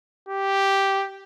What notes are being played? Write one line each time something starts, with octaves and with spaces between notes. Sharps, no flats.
G4